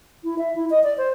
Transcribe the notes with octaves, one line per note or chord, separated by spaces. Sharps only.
E4
E5
E4
D#5
D5
C5